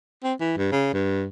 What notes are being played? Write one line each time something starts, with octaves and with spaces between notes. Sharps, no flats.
C4
E3
G2
C#3
G2